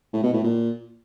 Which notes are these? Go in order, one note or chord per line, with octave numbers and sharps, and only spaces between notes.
A2
B2
A2
A#2